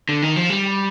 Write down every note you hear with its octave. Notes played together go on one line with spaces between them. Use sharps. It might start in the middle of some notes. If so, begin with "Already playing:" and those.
D3
D#3
F3
G3